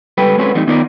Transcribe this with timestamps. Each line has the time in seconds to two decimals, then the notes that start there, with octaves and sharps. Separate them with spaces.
0.18 C#2 G3 A4 B4 G5
0.38 G#3 C4 C#4 F#4 A4 B4
0.55 E3 G3 A3 C4 D#4
0.67 D#3 B3 D#4 F4 A#4 D5